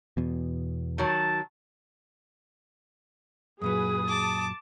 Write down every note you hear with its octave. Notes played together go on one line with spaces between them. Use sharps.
E2 B2
D#3 F#3 A5
F#2 A#2 F#3 G#4 B4 D#6
A5 D6